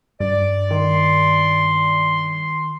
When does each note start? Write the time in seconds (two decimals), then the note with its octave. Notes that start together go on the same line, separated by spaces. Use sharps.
0.20 G2 D5
0.71 D#3 C6